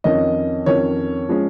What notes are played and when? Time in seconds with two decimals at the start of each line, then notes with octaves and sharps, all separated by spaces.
0.04 F2 D#3 C#4 D#5
0.66 F2 D#3 C#4 C#5
1.29 F3 G#3 C#4